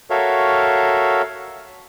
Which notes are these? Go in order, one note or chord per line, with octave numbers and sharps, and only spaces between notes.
F#4 A4 A#4 C#5 E5 F5